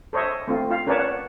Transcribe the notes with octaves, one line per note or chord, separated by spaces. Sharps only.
A4 C5 C#5 D#5 E5
A3 C4 F4
F4 F5
C#4 A#4 B4 C#5 D5 A5
F#5